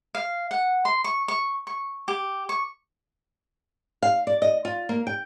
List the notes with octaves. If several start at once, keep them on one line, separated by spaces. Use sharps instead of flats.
F5
F#5
C6
C#6
C#6
C#6
G4
C#6
F5
D5
D#5
F4
A#3
G5